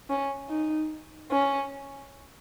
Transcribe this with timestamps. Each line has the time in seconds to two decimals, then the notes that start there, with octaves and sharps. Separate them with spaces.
0.10 C#4
0.49 D#4
1.31 C#4